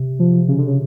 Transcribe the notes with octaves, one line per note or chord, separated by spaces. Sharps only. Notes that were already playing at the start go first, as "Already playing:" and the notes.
Already playing: C3
F3
C#3
D3
C#3